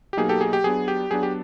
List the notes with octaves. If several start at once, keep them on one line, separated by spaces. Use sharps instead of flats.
G4
B2 F#3 A#3 D#4 G#4
G4 A4
G#4
G4
F#3 B3 D4 G#4
G4
F#3 B3 D4 G#4
G4